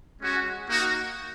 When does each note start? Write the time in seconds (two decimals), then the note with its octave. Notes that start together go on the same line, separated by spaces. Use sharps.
0.22 G#3 C#4 F#4
0.68 A#3 D#4 F#4